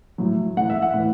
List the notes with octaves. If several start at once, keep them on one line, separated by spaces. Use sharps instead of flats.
A2 F#3
A2 E3 F#5
E5
F#5
A2 E3